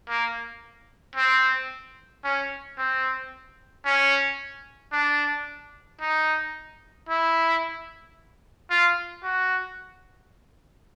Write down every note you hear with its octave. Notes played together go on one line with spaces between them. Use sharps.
A#3
C4
C#4
C4
C#4
D4
D#4
E4
F4
F#4